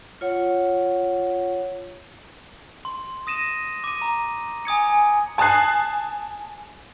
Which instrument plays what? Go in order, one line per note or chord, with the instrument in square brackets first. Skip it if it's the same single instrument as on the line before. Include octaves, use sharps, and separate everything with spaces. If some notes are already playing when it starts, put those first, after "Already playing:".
[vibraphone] F4 C#5 F#5
[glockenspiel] C6
D#6 A#6 D#7 E7
D6 D#7
A#5
G#5 D#6 G#6 C#7
G#5
[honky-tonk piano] G#5 A5 D#6 F#6 C7